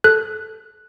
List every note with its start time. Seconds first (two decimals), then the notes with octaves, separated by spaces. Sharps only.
0.04 A4 F#6